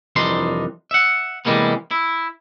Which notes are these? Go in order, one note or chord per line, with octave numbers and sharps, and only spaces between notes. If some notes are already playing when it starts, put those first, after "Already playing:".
C2 F2 E3 D4 D#4 C6
E5 F#5
C3 E3 G3 G#3 A#3 B3
E4